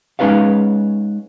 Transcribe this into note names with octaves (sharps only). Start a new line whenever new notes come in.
G#3 C#4 D#4 B4 C#5 F5